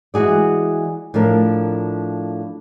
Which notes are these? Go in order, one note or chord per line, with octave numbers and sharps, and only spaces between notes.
E3 G#3 F#4 G#4 D5
A2 F3 D4 A#4